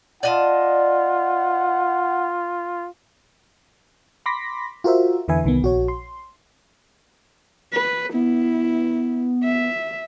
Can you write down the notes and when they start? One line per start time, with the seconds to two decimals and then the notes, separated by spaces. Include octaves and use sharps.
0.23 F4 D5 D#5 F#5 A5
4.26 B5 C6 D6 A#6 B6
4.84 F4 F#4 A#4 C5 E5
5.28 E2 D3 E3 B4 E5 G#5
5.44 C2 D#3 B3
5.62 A#1 F#4 C#5
5.88 C6
7.73 B4
8.14 B3 E4
9.44 E5